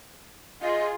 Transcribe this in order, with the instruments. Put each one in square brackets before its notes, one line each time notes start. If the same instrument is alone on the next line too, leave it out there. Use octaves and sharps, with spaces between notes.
[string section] F4 G#4 [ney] D#5